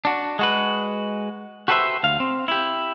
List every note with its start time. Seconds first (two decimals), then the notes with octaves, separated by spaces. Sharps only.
0.05 D4 F#4
0.39 G#3 F#4 B4
1.68 F#4 G4 A4 B4 C5 E5
2.03 D2 F5
2.20 C4
2.48 E4 G4